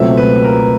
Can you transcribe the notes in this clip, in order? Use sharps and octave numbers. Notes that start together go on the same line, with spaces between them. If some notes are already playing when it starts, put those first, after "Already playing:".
Already playing: C#2 B2 F#3 A3 C4 E5
B4
A#4